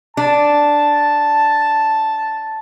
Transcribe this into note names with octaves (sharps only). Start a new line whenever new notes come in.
D4 A5